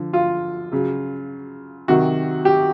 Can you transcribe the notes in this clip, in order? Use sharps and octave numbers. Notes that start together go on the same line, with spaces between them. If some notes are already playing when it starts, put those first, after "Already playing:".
Already playing: D3 F3
F4
C#3 F#3
C3 D#3 F#3 F#4
G4